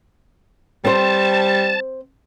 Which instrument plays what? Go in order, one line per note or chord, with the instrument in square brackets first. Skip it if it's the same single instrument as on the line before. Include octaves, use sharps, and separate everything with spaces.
[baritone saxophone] G3 [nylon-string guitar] C4 C5 [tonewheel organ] A5